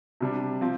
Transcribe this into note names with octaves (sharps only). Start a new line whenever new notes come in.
C3 G3 D4
F3 C4